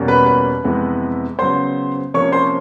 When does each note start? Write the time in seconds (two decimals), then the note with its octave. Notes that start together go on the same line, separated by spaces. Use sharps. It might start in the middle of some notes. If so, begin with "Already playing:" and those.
Already playing: E2 B2 G3 A#3 C#4
0.08 B4 B5
0.26 B4 B5
0.64 F2 C3 E3 G#3 B3
1.39 C#3 F#3 B3 C5 C6
2.14 C3 F3 A#3 C#4 C#5 C#6
2.32 C5 C6